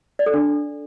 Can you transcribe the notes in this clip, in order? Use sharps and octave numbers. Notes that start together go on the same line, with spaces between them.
D5
A4
D4